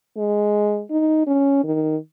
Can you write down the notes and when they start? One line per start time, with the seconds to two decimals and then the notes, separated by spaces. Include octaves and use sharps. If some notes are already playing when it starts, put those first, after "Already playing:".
0.17 G#3
0.90 D#4
1.27 C#4
1.64 D#3